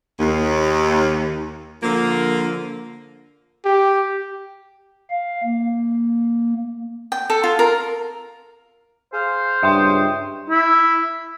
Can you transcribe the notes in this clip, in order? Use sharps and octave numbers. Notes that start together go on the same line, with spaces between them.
D#2
D3 F3 A#3
G4
F5
A#3
G5
A4
F4
A#4
G#4 C5 F5
C#2 G2 E5 G5 C6 D#6
E4